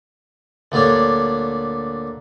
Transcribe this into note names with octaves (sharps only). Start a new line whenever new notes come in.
D2 A#2 G3 D4 C#5